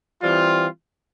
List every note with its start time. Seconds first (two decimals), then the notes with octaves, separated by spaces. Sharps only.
0.22 E3 G3 C4 F4